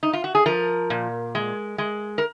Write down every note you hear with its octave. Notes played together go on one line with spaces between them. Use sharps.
D#4
F4
F#4
G#4
F3 A#4
A#2
G#3
G#3
A#4